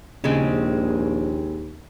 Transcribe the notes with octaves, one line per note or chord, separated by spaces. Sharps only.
A#1 D#2 C#3 G#3 C4